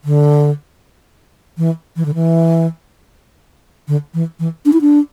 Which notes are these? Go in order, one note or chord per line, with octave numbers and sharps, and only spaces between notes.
D3
E3
E3
D3
E3
D3
E3
E3
D4
E4
D4